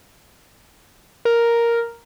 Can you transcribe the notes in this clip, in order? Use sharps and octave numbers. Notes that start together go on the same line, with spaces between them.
A#4